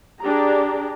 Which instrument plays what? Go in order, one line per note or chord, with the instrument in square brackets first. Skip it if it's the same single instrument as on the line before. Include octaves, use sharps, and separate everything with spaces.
[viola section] D4 G4 G#4 D5 A#5